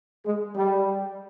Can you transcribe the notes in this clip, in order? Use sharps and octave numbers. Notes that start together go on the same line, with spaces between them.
G#3
G3